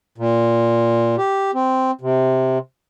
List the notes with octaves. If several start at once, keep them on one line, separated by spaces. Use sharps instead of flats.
A#2
G4
C4
C3